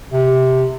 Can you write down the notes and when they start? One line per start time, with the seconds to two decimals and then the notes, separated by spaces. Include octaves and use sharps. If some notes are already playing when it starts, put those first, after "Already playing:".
0.12 C3